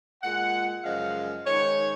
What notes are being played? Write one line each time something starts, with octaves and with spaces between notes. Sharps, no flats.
A#2 G#3 F#5
F#2 C#3 F3 G#3 F5
G#2 D#3 G#3 C#5